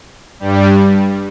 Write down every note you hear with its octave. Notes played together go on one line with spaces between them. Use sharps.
G2 G3